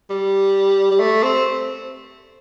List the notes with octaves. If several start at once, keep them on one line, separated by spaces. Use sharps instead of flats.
G3
G3
A3
C4